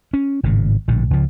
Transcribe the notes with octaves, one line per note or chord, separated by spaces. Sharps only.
C#4
G#1 A2 C#3
A#1 A2 D3
C#2 F3